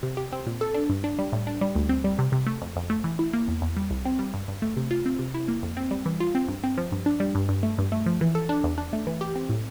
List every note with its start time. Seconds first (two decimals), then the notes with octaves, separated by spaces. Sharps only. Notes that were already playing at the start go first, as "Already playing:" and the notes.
0.03 C3
0.17 G4
0.32 C4
0.47 A#2
0.61 A4
0.74 D4
0.89 G2
1.04 D4
1.19 G3
1.33 A2
1.47 D4
1.61 G3
1.75 D2
1.89 C4
2.04 G3
2.18 C3
2.32 C3
2.47 A3
2.62 F2
2.76 F2
2.90 A3
3.04 E3
3.19 E4
3.33 A#3
3.48 E2
3.62 E2
3.77 G3
3.90 C2
4.05 C4
4.19 G3
4.34 G2
4.48 G2
4.62 A3
4.77 C3
4.91 F4
5.06 C4
5.19 C3
5.34 E4
5.48 A#3
5.63 F2
5.77 C4
5.91 G3
6.06 E3
6.20 F4
6.35 C4
6.48 G2
6.64 C4
6.78 F3
6.92 G2
7.06 D4
7.20 G3
7.35 G2
7.49 G2
7.63 A3
7.78 G2
7.92 A3
8.06 F3
8.21 E3
8.35 A4
8.49 D4
8.64 E2
8.78 D4
8.93 A3
9.07 E3
9.21 G4
9.36 C4
9.49 A2